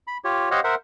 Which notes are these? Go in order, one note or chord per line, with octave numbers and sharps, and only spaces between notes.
B5
F4 G4 C#5
G4 C5 C#5 D#5 F5 F#5
A#4 C5 E5 F#5